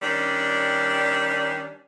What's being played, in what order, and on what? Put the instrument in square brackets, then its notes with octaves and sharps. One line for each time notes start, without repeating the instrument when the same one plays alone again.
[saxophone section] D#3 G3 C#4 D4